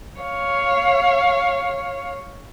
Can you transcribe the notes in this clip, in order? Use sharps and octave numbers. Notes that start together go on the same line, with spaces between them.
C#5 F5